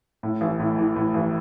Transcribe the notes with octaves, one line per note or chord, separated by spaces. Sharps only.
A2
A1
A2
E3
A2
A1